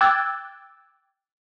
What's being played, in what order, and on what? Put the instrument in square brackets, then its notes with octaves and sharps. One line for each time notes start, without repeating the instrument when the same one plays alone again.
[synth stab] G5 D6 E6 F#6 G#6 A6